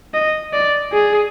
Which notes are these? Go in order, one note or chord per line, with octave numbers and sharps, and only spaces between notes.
D#5
D5
G#4